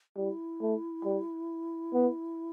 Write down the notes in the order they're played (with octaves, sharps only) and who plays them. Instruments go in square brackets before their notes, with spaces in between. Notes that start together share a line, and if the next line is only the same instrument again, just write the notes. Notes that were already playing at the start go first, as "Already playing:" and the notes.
[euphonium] G3 [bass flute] E4
[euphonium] A3
G3
B3